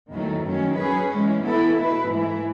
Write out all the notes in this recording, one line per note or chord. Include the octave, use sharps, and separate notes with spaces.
E2 D#3 F#3 A3
F#2 D#3 F#3 C#4
F#3 C#4 G#4 B4
E3 G#3 C#4
E3 B3 E4 A4
B2 A3 E4 B4
G#2 E3 A3 E4